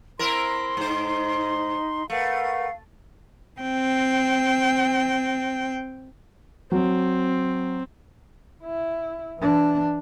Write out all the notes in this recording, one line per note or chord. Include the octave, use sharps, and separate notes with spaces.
C4 E4 A#4 A#5 C6
G#2 D#4 C5
A3 A#4 B4 F5 F#5
C4 G5
F#3 C4
E4
E3 D4